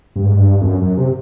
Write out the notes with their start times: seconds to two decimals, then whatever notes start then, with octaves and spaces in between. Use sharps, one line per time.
0.16 G2
0.25 G#2
0.34 G2
0.61 F2
0.65 F#2
0.82 F#2
0.97 C3